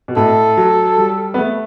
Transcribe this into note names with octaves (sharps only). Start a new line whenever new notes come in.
B2
A2 A4
F#3
G3
B3
A3